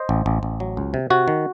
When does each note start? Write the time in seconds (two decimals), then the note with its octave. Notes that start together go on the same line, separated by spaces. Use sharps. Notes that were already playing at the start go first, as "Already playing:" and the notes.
Already playing: C5 D#5
0.09 A1
0.26 A1
0.43 A1
0.60 F#3
0.77 C#2
0.94 C3
1.10 C3 F#4
1.28 D#3